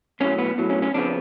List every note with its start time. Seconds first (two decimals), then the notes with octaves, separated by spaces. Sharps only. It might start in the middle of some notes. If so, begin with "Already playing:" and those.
0.20 B1 A2 F#3 C#4
0.39 B3
0.58 B1 A2 F#3
0.70 C#4
0.82 C#4
0.94 F2 C#3 F3 B3 D4